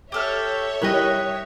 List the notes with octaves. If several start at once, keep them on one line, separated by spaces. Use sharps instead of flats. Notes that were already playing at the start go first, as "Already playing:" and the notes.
G4 A4 C#5 E5 F6
G3 E4 A#4 D#5 G5 F#6